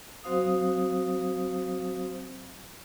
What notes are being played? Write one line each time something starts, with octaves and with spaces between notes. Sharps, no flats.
F#3 C4 F#4 C5 F5 D#6